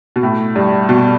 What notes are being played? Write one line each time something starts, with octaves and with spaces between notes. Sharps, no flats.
B2
A2
G2
B2